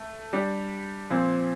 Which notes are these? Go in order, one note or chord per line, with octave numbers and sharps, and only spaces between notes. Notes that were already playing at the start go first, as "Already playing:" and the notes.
Already playing: A3
G3 D4 G4
A#2 F3 C4